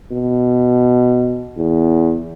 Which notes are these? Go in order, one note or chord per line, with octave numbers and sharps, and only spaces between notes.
B2
E2